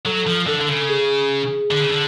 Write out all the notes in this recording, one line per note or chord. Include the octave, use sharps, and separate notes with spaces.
F#3 A4
F3
D3 A4
D3
C#3 A4
G#4
D3
C#3
D3